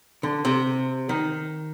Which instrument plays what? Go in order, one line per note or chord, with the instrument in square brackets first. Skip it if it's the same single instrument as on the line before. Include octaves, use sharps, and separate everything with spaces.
[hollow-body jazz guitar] D3
C3
D#3